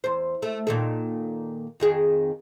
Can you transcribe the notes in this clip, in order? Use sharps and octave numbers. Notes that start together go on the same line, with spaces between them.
E2 C5
A3
A#2 D#3 A4
F2 D#3 G#4